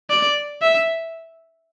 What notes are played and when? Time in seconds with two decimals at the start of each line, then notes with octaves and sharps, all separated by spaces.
0.10 D5
0.62 E5